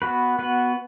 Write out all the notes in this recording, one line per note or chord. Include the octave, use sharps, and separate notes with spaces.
B3 F#4 B4
B3 F#4 B4